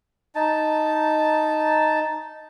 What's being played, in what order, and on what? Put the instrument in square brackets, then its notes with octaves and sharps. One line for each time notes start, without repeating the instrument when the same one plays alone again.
[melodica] D#4 A5